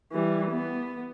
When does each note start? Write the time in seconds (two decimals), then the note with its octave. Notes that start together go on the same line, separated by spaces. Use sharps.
0.12 E3 G3
0.51 B3